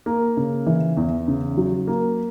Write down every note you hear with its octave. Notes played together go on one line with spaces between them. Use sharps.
A#3
C#3
E3
E2
C#3
F#3
A#3